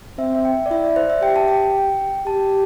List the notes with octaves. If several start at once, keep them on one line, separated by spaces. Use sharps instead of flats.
C4 E5
E5
G5
D5
E4 E5
D5
C5
E5
G4 G5
A5
G5
G4 A5